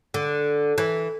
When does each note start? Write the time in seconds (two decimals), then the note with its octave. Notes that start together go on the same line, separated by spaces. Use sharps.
0.14 D3
0.78 E3